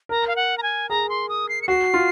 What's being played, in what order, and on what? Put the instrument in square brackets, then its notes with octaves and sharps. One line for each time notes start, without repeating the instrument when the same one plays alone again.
[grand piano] A#4 [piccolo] A#5
[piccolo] F5
F#5
A#5
G#5
[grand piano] G#4 [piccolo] A#5
[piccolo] C6
D#6
C7
C#7
[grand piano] F#4 [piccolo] C7
[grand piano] F4